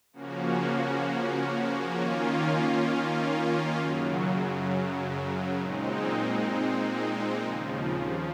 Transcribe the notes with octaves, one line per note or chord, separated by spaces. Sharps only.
C#3 F3 A#3 C#4 F#4
D#3 A#3 C#4 F4
F#2 C#3 F#3
A#2 G#3 C4 D#4
D#2 C#3 F3